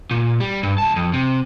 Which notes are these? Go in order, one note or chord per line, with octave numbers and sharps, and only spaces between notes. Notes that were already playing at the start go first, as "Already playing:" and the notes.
A#2
G3
G2
C#2 A5
F2
C3